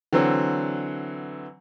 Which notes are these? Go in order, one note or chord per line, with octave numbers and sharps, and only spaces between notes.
D3 E3 F#3 C4